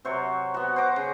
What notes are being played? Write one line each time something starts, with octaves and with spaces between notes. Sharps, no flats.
C3 F#3 C5 C#6
B3 F#4
C5 F#5 A#5 D6
C#3